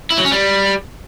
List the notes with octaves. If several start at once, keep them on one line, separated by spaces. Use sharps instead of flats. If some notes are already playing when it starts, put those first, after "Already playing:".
E4
F#3
C#4
G3